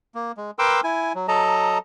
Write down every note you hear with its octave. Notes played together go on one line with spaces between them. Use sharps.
A#3
G#3
A#4 B4 G5 C6 D6 E6
E4 G#5
F#3
F#3 A4 D#5 A5 A#5